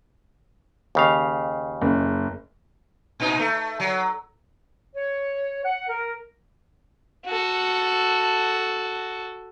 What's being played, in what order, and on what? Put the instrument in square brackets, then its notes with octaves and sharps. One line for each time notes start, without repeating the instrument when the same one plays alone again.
[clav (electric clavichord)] D#2 C#3 F5
[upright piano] F#1
[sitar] A#2 D#4
A3
F#3
[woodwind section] C#5
F#5
A#4
[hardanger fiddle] F#4 A4